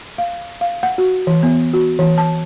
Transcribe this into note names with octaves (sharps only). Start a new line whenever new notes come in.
F5
F5
F#5
F#4
E3
B3
F#4
E3
A5